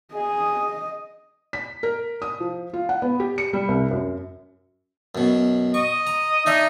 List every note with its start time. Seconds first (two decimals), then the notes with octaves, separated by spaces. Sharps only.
0.14 G#4 D#5
1.53 B6
1.83 A#4
2.22 D#6
2.40 F3
2.73 F4
2.89 F#5
3.02 B3
3.20 G4
3.38 C#7
3.53 G3
3.69 C2
3.91 F#2
5.15 F#2 B2
5.74 D#5 C#6
6.07 A#5
6.46 D4 D#4 E5 A#5